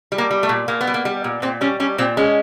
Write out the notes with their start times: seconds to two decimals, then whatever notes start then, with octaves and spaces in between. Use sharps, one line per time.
0.12 G3
0.18 A#3
0.31 G3
0.43 A3
0.49 A#2
0.68 A#2 A#3
0.81 B3
0.87 G3
0.94 A#3
1.05 G3
1.24 A#2
1.42 A#2 C4
1.61 G3 C#4
1.80 G3 C#4
1.98 A#2 C4
2.17 G#3 C#4